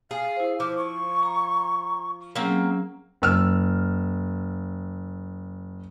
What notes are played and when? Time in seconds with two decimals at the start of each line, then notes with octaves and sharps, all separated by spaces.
0.11 G#4 F5
0.36 E4 C5
0.60 F3 D6
0.78 C#6
1.23 A#5
2.36 F#3 A#3 C4 C#4 G#4
3.22 F#1 E6 F6